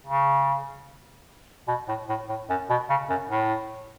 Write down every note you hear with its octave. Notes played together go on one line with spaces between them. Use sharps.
C#3
B2
A2
A2
A2
F#2
B2
C#3
F#2
A2